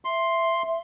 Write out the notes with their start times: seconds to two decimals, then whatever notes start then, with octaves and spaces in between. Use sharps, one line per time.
0.05 E5 C6